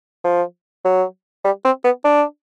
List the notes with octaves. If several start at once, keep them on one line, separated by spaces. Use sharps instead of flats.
F3
F#3
G3
C4
B3
D4